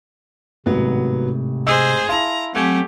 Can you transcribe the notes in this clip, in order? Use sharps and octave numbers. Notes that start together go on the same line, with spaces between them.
G#1 A2 C3 F#3 B3
G#4 C5 D#5 E6
E4 F5 A5 A#5 C6
F#3 A3 C4 G4 F#5 G#5 G#6